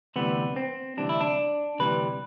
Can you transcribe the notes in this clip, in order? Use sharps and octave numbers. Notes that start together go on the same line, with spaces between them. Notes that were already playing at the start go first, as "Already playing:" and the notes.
D2 C3 E3 G3 B3
C4
D2 C3 E3 G3 D4
E4
D4
D2 C3 E3 G3 B4